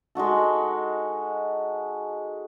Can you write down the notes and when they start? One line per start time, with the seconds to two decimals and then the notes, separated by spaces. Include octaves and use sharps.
0.15 G#3 D#4 F#4 A4